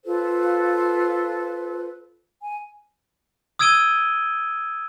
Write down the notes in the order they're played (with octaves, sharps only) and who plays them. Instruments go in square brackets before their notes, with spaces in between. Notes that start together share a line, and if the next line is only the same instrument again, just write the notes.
[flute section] F4 A4 B4 C5
G#5
[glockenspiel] D#6 E6 G#6 D7 D#7 G7